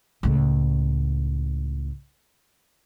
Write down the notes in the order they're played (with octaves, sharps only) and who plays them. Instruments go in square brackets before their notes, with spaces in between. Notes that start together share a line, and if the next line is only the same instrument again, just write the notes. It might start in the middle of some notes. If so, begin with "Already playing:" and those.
[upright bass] C#2 A2